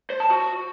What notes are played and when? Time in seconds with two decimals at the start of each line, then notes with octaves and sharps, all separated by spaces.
0.10 C5
0.20 A5
0.30 F#4